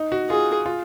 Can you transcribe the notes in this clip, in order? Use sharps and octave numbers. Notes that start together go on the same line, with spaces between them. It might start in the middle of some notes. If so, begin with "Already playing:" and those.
Already playing: D#4
F#4
F4 G#4
F4